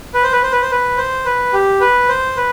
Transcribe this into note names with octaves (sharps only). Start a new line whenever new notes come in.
B4
C5
B4
C5
B4
C5
B4
C5
B4
G4
B4
C5
B4